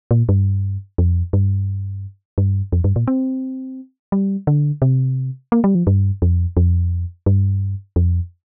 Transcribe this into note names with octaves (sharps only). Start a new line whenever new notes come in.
A#2
G2
F2
G2
G2
F2
G2
A#2
C4
G3
D3
C3
A#3
G3
F3
G2
F2
F2
G2
F2